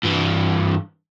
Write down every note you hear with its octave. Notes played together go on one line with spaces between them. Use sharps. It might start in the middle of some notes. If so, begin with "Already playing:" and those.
G2 E3